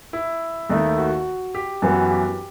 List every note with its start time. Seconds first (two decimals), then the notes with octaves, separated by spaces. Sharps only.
0.13 E4
0.70 D#2 D#3 A3 D#4
0.98 F#4
1.55 G4
1.82 F#2 E3 B3 F#4
2.10 G4